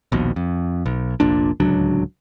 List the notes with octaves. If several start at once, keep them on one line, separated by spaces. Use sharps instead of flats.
A#1 D#2 B2
F2
B1
F1 A#1 A#2 D4
D1 C#2 F#3 D4